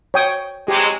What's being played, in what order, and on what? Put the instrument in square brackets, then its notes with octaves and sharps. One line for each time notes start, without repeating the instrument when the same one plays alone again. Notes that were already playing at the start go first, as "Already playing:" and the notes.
[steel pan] C#5 G5 D#6
[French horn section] F2 F#3 G#3 [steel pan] G4